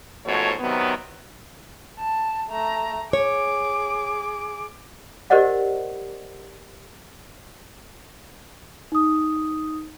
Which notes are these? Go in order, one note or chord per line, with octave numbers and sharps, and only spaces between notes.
G#2 B2 F3 A3 F#4 C#5
C3 D#3 F#3 B3
A5
A3 A#5
G#4 C#5 D6
G4 A#4 C5 D5 D#5 F#5
D#4 D#6